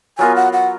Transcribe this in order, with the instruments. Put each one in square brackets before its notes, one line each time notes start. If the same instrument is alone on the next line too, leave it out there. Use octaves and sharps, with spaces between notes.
[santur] F#3 B3 F4 A#4 [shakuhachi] G#5
[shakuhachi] F#5
F#5